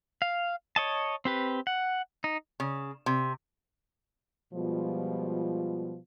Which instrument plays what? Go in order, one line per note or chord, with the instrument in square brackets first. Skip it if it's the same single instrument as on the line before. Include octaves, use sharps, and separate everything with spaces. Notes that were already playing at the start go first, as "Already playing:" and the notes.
[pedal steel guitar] F5
C#5 D#5 A5
C4 G4 B4
F#5
D#4
[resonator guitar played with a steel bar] C#3
C3
[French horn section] B2 F3 G3 G#3 F4